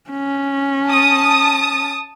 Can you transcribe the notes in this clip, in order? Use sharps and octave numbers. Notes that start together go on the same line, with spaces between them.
C#4
A5 D#6